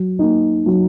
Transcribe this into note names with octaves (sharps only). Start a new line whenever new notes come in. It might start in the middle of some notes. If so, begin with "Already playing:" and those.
Already playing: F#3
A#3 D#4
F#3